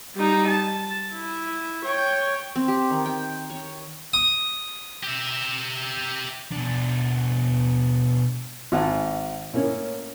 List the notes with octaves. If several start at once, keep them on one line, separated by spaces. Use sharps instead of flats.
G3 D#4
A5
E4
C#5 G5
C4
G4
D#3
G5
C#5
D#6
G4 E5
B2 D4
G#1 F#5 G#5 A5
A2 A#3 C#4